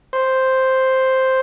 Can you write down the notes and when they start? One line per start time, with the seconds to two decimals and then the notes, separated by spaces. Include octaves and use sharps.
0.13 C5